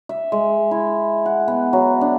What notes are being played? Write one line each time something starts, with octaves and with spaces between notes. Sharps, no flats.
E5
G#3
E4
F#5
B3
F#3
D4